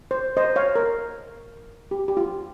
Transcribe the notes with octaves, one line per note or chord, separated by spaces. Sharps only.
C5
C5 D#5
C#5 F5
A#4
G4
G4
F4